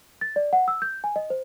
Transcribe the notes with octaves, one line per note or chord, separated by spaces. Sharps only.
A6
D5
F#5
E6
G6
G#5
D#5
C5